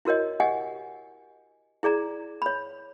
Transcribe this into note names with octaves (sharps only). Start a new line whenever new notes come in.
E4 F#4 A#4 C#5 D#5
G4 D#5 F#5 G#5
E4 G#4 D5 A#5
C#5 B5